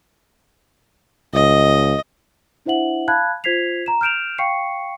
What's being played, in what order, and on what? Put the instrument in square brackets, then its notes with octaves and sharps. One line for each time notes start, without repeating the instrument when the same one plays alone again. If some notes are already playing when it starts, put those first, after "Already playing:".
[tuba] C#2 [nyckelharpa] D#5
[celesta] D4 E4 C5 E5 F#5 F#7
F5 A5 B5 F#6 G#6
F4 C5 G#6 B6 C7 F7
A#5 E7
F6 G6 D7 E7 F7
F5 G5 C#6 C7 C#7